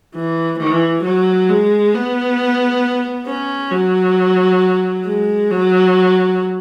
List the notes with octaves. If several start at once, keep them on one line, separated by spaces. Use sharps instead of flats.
E3
E3
F#3
G#3
B3
C#4
F#3
G#3
F#3